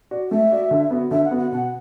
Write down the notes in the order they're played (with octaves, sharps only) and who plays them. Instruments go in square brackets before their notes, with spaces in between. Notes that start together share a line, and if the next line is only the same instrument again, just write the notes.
[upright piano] F#4 D5
[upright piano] A3 [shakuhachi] E5
[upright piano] F#4 D5
D3
B3 F#4
[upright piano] D3 [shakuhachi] E5
[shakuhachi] F#5
[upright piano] B3 F#4
[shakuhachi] F#5
[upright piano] B2 [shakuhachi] F#5